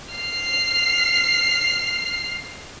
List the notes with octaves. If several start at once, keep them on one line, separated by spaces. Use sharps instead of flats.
F6 C7